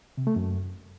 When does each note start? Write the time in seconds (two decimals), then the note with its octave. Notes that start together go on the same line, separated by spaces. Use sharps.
0.18 C3
0.27 A3
0.36 F#2